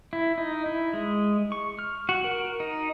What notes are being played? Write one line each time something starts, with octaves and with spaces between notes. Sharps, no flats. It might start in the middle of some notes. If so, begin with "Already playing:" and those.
E4
D#4
E4
G#3
C#6
F6
F#4
A#4
D#4